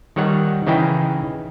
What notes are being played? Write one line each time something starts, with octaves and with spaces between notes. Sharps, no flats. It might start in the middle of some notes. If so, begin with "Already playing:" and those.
D#3 G3 C#5 F#5
C#3 E3 D#4 E4 G#4 G5